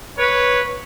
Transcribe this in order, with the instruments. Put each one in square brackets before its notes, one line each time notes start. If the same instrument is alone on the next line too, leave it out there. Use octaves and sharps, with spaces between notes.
[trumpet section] B4 C#5